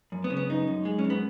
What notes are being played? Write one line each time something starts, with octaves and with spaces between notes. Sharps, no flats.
F#2
B3
C#3
B3
F#2 D#4
F#2
G#3
C#4
F#2
B3